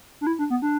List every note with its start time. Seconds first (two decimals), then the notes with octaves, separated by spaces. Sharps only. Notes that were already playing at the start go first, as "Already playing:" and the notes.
0.21 D4
0.27 E4
0.39 D4
0.50 B3
0.62 D4